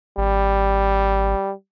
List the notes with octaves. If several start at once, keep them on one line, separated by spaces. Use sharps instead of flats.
G#1 G3